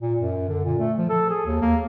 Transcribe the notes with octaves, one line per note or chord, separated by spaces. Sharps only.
A#2
F#2
D3
A#2
A3
F3
A4
G#4
D#2
A#3